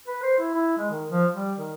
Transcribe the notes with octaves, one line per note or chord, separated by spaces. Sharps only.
B4
C5
E4
E4
G#3
D#3
F3
G3
D#3